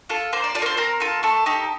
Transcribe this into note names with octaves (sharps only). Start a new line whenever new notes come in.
F4 A4
A#3 C5
D5
F4 A4 D5
A#4
C5
C4 A#4
F4 A4
A3 A4
D#4 G4